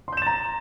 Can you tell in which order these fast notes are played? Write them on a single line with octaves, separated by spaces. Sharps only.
C6 G6 E7 A6 A#5